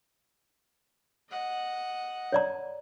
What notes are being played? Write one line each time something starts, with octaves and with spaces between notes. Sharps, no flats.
D#5 F#5
C#5 D5 A#5